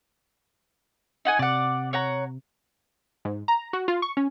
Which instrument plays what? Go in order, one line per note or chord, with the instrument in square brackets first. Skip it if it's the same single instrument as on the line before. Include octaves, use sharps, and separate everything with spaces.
[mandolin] D#4 F#5 G#5
[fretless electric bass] C3 [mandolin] D5 F#5
[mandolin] C#5 F#5 A#5
[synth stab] G#2
A#5
F#4
F4
C#6
C#4